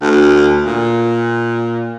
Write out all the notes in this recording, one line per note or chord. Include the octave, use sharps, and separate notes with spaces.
D2
A#2